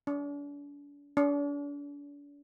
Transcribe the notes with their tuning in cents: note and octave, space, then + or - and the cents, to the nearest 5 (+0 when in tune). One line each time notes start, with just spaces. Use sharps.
D4 -40
D4 -40